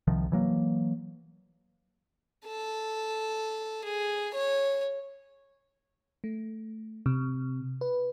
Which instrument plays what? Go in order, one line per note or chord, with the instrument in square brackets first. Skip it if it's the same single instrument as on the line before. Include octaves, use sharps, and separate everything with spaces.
[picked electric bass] C2 C3 D#3 F3
E3 F#3 A#3
[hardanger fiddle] A4
G#4
C#5
[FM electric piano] A3
C3
B4